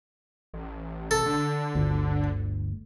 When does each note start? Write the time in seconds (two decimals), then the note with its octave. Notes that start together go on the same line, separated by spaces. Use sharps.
0.54 A1
1.11 A4
1.26 D3
1.75 G1 D2